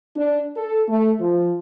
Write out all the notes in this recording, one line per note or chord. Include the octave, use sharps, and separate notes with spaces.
D4
A4
A3
F3